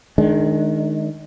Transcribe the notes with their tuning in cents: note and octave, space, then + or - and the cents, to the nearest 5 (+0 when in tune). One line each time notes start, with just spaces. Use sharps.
D#3 -5 G#3 +30 D4 +0